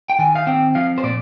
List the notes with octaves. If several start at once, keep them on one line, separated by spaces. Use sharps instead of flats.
G5
D#3 G#5
F5
C4 G5
F3 F5
C5
A#2 D5